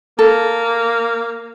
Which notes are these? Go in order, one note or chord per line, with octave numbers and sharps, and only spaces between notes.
A#3 A4